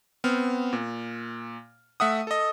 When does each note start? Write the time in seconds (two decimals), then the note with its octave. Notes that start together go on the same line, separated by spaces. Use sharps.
0.24 B3 C4 F6
0.73 A#2
2.00 A3 E5 F#5 D#6
2.27 A4 D#5